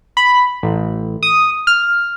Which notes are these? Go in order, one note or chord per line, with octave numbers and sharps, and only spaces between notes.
B5
A1
D#6
F6